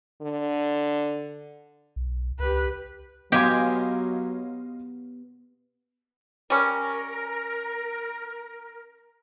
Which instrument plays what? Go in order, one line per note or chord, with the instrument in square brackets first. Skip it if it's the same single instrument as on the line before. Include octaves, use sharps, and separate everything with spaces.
[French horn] D3
[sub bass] B1
[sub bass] C#2 [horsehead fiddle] G4 B4
[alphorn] F#3 [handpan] B3 [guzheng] G4 G#5 [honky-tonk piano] D#5 F5 C6
[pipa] G3 C#4 [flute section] A#4